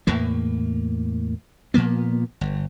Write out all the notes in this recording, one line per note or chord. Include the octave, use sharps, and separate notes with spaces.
E2 A2 A#3
A#2 F3 A#3 B3
G1